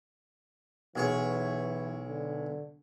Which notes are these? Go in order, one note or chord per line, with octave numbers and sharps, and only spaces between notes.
B1 E3 G#4 C#5
D3